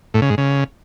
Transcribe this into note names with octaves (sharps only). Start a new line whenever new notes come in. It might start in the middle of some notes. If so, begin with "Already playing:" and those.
A2
C#3
G#2
C#3